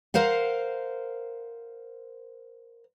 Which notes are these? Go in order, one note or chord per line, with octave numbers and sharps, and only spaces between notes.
A#4 C5 F5 F#5